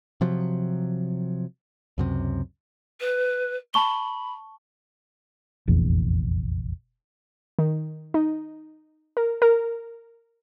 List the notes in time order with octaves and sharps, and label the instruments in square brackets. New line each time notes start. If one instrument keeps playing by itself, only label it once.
[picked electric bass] C3 F3 F#3
C#2 F#2 C3
[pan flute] B4
[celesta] A5 C#6 G7 [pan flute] B5
[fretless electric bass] F1 A#1 E2
[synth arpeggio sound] D#3
D#4
A#4
A#4